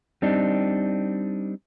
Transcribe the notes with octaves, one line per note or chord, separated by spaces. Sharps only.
G3 C4 D4 D#4